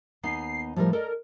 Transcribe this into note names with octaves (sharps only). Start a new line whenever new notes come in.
D#2 B3 D#4 C7
A2 F3 G3 A#4
A4 A#4 D5 D#5